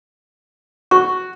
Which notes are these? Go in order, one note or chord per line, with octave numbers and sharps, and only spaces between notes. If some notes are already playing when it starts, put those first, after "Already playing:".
F#4 C#6